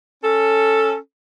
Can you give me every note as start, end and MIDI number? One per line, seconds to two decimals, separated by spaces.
0.24 0.97 61
0.24 0.97 69